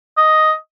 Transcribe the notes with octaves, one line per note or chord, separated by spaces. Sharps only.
D#5